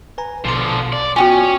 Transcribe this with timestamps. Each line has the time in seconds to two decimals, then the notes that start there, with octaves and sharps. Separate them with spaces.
0.18 B4 G#5 A#5
0.45 A#1 B2 D3 F3 C6
0.93 D5
1.16 B3 C#4 F4 F#4 G5 G#5